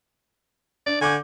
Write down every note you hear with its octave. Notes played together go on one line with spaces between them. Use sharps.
D4 D5
D3 G#5 C#6 D6 G6